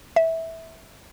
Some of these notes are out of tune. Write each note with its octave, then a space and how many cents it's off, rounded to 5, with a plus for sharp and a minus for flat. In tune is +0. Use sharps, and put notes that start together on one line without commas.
E5 -15